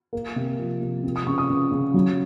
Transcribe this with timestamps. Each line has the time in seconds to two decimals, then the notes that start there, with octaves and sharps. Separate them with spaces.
0.13 A#3
0.36 C3
0.59 F3
0.81 C3
1.03 C4
1.16 D#6
1.27 C#3 C#6
1.38 D#6
1.50 C#3
1.72 C#3
1.94 F#3